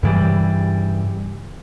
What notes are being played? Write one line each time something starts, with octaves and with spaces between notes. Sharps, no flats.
G2 C#3 E3 G3